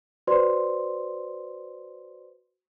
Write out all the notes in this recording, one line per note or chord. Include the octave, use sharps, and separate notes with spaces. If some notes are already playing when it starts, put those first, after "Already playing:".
F#4 B4 C5 D5 C6